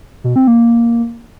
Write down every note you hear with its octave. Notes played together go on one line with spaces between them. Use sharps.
B2
C4
A#3